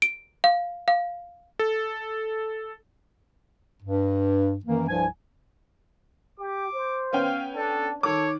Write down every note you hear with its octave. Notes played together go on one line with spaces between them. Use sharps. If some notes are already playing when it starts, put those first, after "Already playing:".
D7
F5
F5
A4
G2
F#2 D#3 E3 A#3
C2 G2 F3 G#5
G4 D6
C5
B3 C#4 F5 G5
D4 A4
D#3 A4 C#5 D6